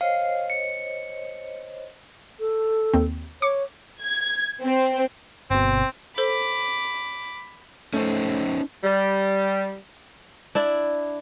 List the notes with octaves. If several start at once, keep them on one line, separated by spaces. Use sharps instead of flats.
C5 C#5 D#5 F5
C#7
A4
D#2 C4
C#5 D6 C#7
G#6
C4
G1 B2 C4
A4 C5 B5 D6
A3 C#4 D#4 C5
G3
D4 E4 D5